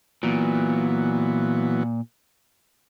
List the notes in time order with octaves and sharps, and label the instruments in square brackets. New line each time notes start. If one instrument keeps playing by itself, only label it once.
[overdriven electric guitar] A#2 [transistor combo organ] E3 F#3 B3